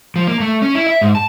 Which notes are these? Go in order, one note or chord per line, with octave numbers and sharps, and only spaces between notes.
F3
A#3
A3
C#4
E4
E5
G#2
A5